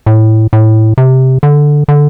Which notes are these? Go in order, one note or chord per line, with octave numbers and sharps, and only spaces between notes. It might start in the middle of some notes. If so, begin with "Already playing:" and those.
A2
A2
C3
D3
D3